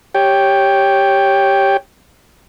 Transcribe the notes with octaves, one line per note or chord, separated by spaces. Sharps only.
G4 C#5 G5